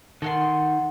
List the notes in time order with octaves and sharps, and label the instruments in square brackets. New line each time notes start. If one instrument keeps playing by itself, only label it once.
[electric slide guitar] D#3 [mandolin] A4 F#5 C6